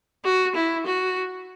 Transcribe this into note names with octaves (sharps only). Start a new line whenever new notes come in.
F#4
E4
F#4